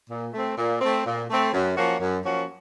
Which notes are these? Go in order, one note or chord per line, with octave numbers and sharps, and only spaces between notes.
A#2
A3 C4
A#2
A3 C4
A#2
A3 C4
F#2
F3 A#3 C#4 F#4
F#2
F3 A#3 C#4 F#4